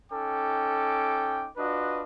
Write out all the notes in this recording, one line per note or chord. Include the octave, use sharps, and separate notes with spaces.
C#4 D#4 A4 G5 D6
D4 F4 F#4 B4 D#5